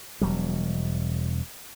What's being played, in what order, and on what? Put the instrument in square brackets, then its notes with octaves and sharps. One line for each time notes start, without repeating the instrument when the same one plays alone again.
[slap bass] E1 F#3 G3